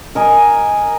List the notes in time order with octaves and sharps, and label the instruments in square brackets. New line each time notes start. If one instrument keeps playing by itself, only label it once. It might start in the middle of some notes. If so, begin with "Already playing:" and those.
[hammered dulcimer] A#4 D#5 G#5